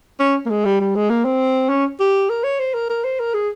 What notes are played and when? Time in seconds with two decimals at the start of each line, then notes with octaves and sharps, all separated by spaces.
0.20 C#4
0.46 A#3
0.50 G#3
0.65 G3
0.81 G3
0.96 G#3
1.10 A#3
1.25 C4
1.69 C#4
2.00 G4
2.29 A#4
2.44 C#5
2.59 C5
2.74 A#4
2.90 A#4
3.04 C5
3.19 A#4
3.34 G#4